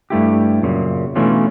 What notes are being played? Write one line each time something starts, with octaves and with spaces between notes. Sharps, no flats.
G2 A3 E4 G4
F#2 A#2 C#3
B2 E3 A3 C#4 D4 F4